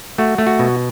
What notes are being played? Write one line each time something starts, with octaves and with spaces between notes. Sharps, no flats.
A3 F#4
A3
F#4
B2